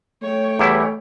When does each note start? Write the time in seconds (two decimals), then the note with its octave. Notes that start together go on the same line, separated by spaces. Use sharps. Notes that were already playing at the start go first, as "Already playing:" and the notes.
0.22 A3 C#5 G5
0.59 E2 G3 E4